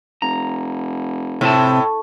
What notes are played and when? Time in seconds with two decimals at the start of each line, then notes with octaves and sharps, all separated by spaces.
0.22 F1 A#5
1.41 A2 C3 C4 A5